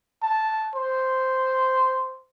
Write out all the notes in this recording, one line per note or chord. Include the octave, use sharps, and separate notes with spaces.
A5
C5